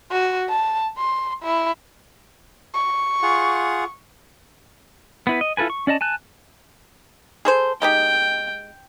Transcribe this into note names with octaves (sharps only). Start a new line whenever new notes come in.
F#4
A5
C6
E4
C#6
F4 G#4 F#5
B3 E4 B4
D#5
E4 F4 A4 B4 G#5
C#6
C#4 D5 D#5 A5
G#5 A5 F#6
G#4 A4 C5
G#3 D#4 G4 G5